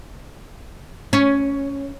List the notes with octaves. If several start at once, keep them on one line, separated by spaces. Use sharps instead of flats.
C#4